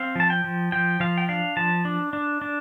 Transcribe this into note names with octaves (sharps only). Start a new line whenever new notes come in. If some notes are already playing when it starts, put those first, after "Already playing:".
Already playing: C4 F5
F3 A5
G5
F3
F3 G5
F3 F5
G5
D4 F5
F3 A5
D4
D4
D4